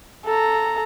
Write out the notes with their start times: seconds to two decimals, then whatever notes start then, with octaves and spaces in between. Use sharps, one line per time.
0.25 A4 A#5